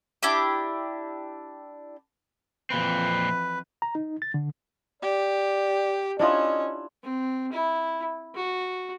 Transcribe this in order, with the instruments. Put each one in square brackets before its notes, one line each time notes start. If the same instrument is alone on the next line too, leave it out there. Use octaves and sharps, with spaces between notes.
[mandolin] D4 E4 G4 D6
[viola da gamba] F2 E3 [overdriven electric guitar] A#2 C4 [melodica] B4
[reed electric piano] A#5
D#4
A6
D3
[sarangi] G4 [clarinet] D5
[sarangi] C#4 [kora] D4 E4 F4 [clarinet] D#5
[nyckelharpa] C4
E4
F#4